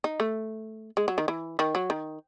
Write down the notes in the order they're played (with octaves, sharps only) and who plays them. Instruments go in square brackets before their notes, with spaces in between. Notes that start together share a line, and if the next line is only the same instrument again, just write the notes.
[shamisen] D#4
A3
G#3
F#3
D#3
E3
D#3
F#3
D#3